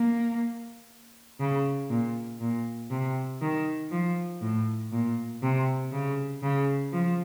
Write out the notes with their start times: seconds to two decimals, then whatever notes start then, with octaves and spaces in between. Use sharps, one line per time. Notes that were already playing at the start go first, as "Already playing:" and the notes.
Already playing: A#3
1.40 C#3
1.90 A#2
2.41 A#2
2.91 C3
3.42 D#3
3.91 F3
4.42 A2
4.92 A#2
5.43 C3
5.92 C#3
6.43 C#3
6.93 F3